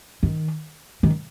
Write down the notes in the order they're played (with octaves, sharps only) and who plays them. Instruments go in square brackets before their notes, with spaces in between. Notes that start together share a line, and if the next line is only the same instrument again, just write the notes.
[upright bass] D#3
D#3